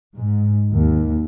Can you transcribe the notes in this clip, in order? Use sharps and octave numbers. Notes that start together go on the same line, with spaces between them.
G#2
D#2